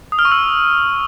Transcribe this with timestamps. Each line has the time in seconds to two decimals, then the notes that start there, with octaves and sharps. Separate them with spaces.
0.12 D#6
0.19 F6
0.25 C#6
0.32 E6